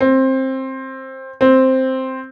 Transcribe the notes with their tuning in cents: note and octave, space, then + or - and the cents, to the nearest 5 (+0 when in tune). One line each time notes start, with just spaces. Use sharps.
C4 +15
C4 +0